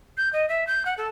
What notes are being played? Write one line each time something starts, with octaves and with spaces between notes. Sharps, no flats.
G6
D#5
E5
G6
F#5
A4